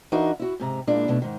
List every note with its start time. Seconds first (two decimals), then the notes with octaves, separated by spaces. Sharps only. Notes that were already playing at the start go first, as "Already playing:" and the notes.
0.12 E3 D4 D#4 F#4 A#4 D#5
0.40 E4 F#4
0.60 G#2 C3 A#5
0.87 A#2 G#3 A#3 D4 E4
1.08 B2 A3 D4
1.22 G#2 D#3